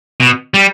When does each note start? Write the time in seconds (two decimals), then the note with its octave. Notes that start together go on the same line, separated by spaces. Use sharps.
0.20 B2
0.54 G3